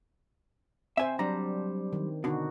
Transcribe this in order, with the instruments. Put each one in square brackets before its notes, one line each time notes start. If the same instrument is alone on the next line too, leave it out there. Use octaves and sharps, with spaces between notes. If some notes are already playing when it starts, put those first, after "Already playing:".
[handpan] C4 C5 [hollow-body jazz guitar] E5 G#5
[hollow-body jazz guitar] F#3 G3 A#5 [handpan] D4
[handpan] D#3
[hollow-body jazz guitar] B2 D3 [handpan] D#4 F#4